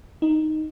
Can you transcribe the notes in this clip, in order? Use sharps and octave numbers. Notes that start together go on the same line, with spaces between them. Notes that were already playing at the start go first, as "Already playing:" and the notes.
D#4